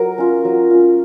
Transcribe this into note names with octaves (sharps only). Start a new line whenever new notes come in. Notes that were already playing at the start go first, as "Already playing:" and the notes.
Already playing: F#3 A#4
C#4 F4
F#3
C#4 F4